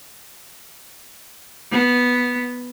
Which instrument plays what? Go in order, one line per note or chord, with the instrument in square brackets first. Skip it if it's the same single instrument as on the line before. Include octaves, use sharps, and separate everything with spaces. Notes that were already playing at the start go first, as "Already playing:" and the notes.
[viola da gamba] B3